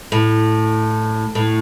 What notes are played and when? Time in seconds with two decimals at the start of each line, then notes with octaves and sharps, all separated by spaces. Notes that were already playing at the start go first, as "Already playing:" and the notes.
0.12 A2
1.35 A2